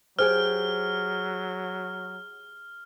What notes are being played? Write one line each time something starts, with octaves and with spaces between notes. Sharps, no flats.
F#3 G4 G#4 C5 G5 F6